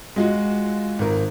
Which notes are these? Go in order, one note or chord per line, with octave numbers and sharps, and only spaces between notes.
G#3 F4 F#4
G#1 A#4